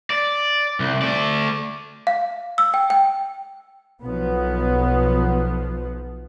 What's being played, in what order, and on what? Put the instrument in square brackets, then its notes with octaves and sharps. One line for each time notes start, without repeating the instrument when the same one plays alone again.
[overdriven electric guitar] D5
C2
A3 D5
[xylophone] F5
E6
G5
G5
[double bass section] B1 F3 B3